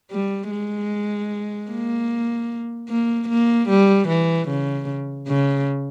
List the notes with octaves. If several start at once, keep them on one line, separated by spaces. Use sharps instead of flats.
G3
G#3
A#3
A#3
A#3
G3
E3
C#3
C#3